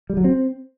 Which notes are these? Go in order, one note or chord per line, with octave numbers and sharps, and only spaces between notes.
G3
F#3
C4